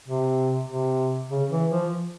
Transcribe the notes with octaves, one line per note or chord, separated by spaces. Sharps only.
C3
C3
C#3
E3
F3